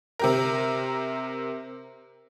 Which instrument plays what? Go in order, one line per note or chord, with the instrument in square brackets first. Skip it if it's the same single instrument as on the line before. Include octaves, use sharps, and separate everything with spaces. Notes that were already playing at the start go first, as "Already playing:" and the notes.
[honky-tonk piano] C3 G4 A#4